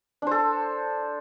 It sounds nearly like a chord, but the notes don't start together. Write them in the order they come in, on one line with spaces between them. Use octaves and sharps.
D4 C5 A4